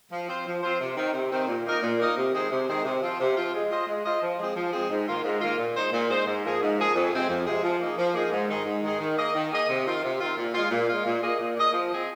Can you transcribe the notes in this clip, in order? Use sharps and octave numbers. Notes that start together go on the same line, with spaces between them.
F3
C4 F4 C5
F3
C4 F4 C5
C3
D#3 C4
C3
D#3 C4
A#2
A#3 D#4 A#4 D#5
A#2
A#3 D#4 A#4 D#5
C3
D#3 G#3 C4 G#4
C3
D#3 G#3 C4 G#4
C3
F3 C4 F4
C3
F3 C4 F4
G#3
F4 C5 D#5
G#3
F4 C5 D#5
F3
G#3 C4 G#4
F3
G#3 C4 G#4
G#2
D#3 A#3 F4
G#2
D#3 A#3 F4
A#2
G#3 D#4 C5
A#2
G#3 D#4 C5
G#2
F3 A#3 G#4
G#2
F3 A#3 G#4
F2
C3 G#3 C4 G#4
F2
C3 G#3 C4 G#4
F3
A#3 D#4 G#4
F3
A#3 D#4 G#4
G#2
D#3 G#3 D#4 G#4
G#2
D#3 G#3 D#4 G#4
D#3
A#3 G#4 D#5
D#3
A#3 G#4 D#5
C3
D#3 C4 F4
C3
D#3 C4 F4
A#2
G#3 F4
A#2
G#3 F4
A#2
A#3 G#4 D#5
A#2
A#3 G#4 D#5
F3
C4 G#4 D#5